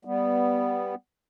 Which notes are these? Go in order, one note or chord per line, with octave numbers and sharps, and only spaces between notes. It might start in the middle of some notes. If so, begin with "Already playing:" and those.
G3 B3